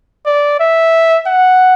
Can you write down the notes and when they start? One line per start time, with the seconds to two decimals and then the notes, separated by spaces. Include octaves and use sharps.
0.26 D5
0.60 E5
1.27 F#5